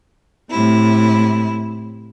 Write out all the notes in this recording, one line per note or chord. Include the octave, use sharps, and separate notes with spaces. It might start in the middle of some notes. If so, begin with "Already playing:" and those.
A2 C3 E4